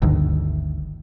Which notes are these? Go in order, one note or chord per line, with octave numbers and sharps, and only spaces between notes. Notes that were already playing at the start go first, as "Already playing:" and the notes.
G1 D2 D#3